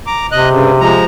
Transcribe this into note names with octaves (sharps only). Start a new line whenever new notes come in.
A#5 D6
C3 D#5 F#6
G2 C#3
F3 G#3 A#5